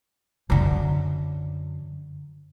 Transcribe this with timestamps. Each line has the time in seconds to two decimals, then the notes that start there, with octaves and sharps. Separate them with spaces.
0.50 F#2 D3